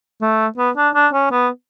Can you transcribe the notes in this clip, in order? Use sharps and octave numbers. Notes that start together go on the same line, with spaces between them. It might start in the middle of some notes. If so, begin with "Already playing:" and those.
A3
B3
D4
D4
C#4
B3